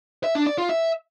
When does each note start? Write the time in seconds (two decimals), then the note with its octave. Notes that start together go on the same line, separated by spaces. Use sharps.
0.24 E5
0.35 D4
0.47 D5
0.58 F4
0.69 E5